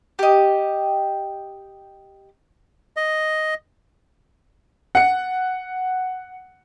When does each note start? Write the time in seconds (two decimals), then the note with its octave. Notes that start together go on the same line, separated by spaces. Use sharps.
0.19 G4 D#5
2.97 D#5
4.95 F#5 C#7